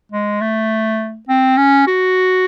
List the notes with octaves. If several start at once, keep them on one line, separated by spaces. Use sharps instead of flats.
G#3
A3
C4
C#4
F#4